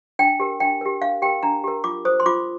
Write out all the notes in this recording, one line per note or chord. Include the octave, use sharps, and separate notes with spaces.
D4 G5
G4 A#4
D4 G5
G4 A#4
D4 F5
G4 A#4 G5
D4 A#5
G4 A#4
F4 D6
C5 D#6
C6
F4 D6